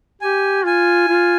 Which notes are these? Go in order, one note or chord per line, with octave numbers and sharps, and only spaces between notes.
G4 G#5
F4 G#5
F4